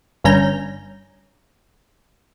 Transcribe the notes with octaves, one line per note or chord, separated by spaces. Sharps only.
G1 G2 C#4 A#5 G6